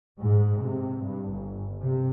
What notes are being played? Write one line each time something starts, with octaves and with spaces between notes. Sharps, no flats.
G#2
C3
G2
G1
C3